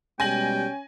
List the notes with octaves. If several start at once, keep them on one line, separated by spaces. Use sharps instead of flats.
B2 G3 G#3 C#4 G5 G#5 A#6 F#7